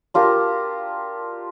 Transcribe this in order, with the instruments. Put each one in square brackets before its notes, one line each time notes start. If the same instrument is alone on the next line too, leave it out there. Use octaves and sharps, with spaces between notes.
[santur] D4 F4 G4 A#4